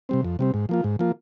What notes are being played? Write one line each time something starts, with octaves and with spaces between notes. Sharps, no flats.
C3 G3 C4
F2
C3 G3 C4
G#2
F3 A#3 F4
G#2
F3 A#3 F4